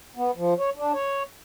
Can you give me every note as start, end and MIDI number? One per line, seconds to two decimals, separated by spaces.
0.17 0.31 59
0.36 0.54 53
0.59 0.70 73
0.76 0.92 62
0.93 1.23 73